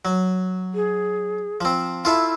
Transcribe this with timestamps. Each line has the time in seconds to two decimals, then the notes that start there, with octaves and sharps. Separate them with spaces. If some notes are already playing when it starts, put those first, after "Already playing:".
0.05 F#3
0.74 G#4
1.61 F3 C4
2.05 E4 F4 A4 E5